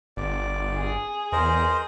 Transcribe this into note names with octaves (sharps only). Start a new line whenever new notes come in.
G1 D5
G#4
E2 A#4 C5 D#5